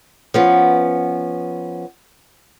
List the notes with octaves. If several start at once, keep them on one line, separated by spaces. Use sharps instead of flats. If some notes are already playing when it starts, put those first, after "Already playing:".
F3 B3 C#4